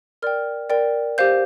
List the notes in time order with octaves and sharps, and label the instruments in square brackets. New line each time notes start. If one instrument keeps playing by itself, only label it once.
[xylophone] A#4 D5 G5 F6
A#4 D5 G5
G4 C5 F5 G6